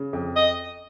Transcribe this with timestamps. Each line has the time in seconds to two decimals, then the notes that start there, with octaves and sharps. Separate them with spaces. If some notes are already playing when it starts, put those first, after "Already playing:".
Already playing: C#3
0.13 F2
0.36 D#5